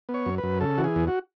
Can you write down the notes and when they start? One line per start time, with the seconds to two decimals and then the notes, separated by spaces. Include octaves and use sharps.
0.09 B3
0.14 C#5
0.26 F#2
0.38 B4
0.43 F#2
0.61 C#3 A4
0.78 E3 F#4
0.84 G#4
0.96 E2
1.08 F#4